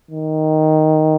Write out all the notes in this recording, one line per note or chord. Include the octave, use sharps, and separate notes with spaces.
D#3